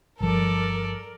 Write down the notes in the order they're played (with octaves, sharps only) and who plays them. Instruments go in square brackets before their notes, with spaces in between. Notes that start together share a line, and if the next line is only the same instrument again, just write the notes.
[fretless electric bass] G1 F3 [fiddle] A4 D5 [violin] A#4